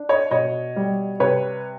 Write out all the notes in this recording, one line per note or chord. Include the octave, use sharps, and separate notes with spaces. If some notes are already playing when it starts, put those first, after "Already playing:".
Already playing: D4
C#5 D#5
B2 C#5 D#5
G3
C3 B4 C#5